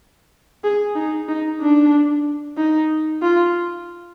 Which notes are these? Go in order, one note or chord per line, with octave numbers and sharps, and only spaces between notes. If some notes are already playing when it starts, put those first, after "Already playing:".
G#4
D#4
D#4
D4
D#4
F4